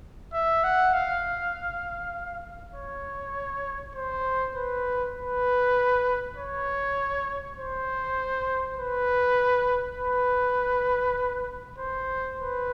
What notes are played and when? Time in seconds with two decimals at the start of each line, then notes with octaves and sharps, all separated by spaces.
0.33 E5
0.64 F#5
0.94 F5
2.75 C#5
3.95 C5
4.56 B4
5.16 B4
6.36 C#5
7.57 C5
8.77 B4
9.98 B4
11.78 C5
12.39 B4